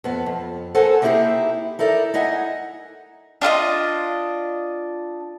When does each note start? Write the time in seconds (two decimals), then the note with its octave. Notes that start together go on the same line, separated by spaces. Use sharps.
0.04 F2 B3
0.26 F2
0.75 A4 A#4 C5 F#5 G#5 A5
1.02 A#3 C4 D#4 E4 G4 G#4
1.79 D#4 E4 A4 A#4 D5
2.14 D#4 E4 D#5 F#5 G#5
3.41 D4 F4 A4 D#5